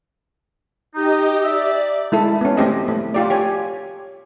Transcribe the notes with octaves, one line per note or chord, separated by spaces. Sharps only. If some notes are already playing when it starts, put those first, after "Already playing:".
D#4 G4 D#5
D5 E5
G#3 E4 A4
B3 C#4
A3 C4 G4 D#5
A3
F4 G4 D5
G4 C#5 G#5